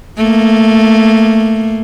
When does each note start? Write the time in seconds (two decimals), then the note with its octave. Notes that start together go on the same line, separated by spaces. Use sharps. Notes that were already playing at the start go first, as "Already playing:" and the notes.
0.17 A3 A#3